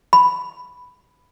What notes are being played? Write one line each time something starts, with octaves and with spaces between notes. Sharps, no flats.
B5